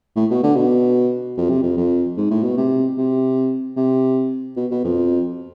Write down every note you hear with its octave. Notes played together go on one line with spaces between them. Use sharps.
A2
B2
D3
B2
F2
C3
F2
F2
G#2
A2
B2
C3
C3
C3
B2
B2
F2